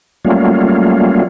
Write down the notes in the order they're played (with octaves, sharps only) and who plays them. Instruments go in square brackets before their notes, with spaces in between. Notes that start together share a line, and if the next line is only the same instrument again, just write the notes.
[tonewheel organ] F#3 G3 A3 A#3 C#4 F4